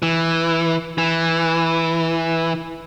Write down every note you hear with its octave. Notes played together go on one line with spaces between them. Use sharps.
E3
E3